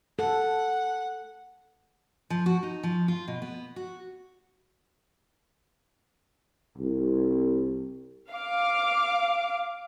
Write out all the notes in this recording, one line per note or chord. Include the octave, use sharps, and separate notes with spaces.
A4 F#5
F3
F#4
D#4
F3
F4
B2
B3
F#4
C2
F5 D6